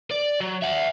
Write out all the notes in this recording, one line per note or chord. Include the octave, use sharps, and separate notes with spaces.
D5
F#3
E5 F#5